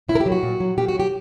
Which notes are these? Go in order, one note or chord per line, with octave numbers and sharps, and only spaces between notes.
A#2 E4
A#4
G4
F#3
F#4
A#2
F#3
A#2 G4
F#4
F#3 G4